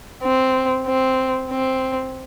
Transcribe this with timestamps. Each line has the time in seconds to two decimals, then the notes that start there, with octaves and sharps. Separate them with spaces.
0.24 C4
0.86 C4
1.50 C4